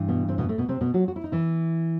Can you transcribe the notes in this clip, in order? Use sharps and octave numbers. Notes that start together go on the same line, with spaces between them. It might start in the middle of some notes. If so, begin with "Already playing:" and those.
Already playing: G2 E3
B2 B3
C3 C4
B2 B3
A2 A3
B2 B3
C3 C4
B2 B3
F#3 F#4
F#4
E4
D#4
E3 E4